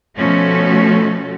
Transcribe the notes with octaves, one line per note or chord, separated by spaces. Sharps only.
B2 F3 A3 C#4 F#4 A4